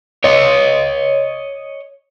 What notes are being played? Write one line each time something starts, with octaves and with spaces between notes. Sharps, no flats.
C#5 D#5